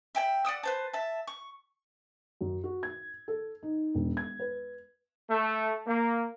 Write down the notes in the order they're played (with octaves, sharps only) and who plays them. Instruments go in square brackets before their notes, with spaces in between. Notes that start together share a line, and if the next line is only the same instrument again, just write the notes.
[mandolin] E5 G5 G#5 B5
D5 F#5 D#6 E6
B4 C5 A5
E5 A5
C#6
[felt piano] F#2
F#4
G#6
A4
D#4
E1
G#6
B4
[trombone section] A3
A#3